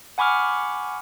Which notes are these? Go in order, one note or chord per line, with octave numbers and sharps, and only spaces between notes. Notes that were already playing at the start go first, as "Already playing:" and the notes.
F#5 G#5 B5 C#6 D6 F6